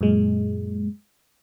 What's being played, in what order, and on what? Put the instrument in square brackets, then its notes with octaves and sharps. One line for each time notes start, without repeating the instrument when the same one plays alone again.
[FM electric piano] F#2 A#2 G#3